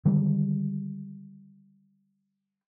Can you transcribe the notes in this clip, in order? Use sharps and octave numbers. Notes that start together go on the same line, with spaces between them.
D3 D#3 G3 G#3